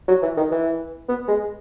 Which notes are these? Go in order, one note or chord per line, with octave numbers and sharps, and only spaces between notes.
F#3
E3
D#3
E3
B3
G#3